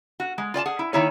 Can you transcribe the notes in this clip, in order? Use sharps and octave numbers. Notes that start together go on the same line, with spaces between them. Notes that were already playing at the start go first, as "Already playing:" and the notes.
F#4
G#3
F4 D5 G#5 A5
G#4 F#5
E4
D#3 A#3 D#4 E4 G#4 C#5